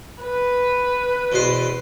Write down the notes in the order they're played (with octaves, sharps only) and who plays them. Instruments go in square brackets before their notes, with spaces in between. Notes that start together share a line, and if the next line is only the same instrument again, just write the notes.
[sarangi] B4
[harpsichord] E2 B2 C5